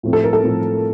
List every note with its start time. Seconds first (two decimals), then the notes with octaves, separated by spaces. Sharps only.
0.03 A2 F3 A3 C4
0.13 A4
0.24 A#4
0.33 A4
0.43 A2 F3 A3 C4